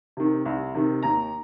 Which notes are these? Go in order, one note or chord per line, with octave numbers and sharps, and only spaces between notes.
C3 D#3
C2
C3 D#3
D#2 A#5